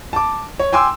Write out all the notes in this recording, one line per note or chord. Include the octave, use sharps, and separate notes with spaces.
A5 D6
C#5
G5 G#5 C6 D6 E6